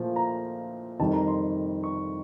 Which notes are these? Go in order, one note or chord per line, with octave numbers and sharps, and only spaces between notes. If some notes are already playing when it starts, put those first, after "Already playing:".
Already playing: A#2 F3 A3
A#5
F2 C3 D#3 G3 A5
A#5
C6
C#6